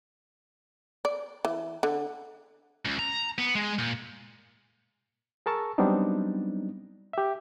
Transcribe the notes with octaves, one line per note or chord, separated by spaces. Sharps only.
D5
E3
D3
C#2
A#5
B3
G#3
A#2
G#4 A#4 A5 C#6 E6
F#3 G3 B3 C4 D4 D#4
G4 E5